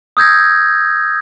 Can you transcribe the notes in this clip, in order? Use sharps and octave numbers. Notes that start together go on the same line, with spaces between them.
D#6 E6 G6 G#6 A#6